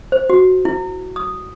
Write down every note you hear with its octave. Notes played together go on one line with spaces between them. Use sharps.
C5
F#4
E4
D#6